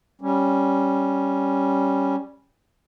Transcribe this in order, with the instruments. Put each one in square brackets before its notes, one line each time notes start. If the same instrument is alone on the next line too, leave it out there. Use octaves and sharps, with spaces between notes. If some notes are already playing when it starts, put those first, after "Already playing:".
[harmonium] G3 C#4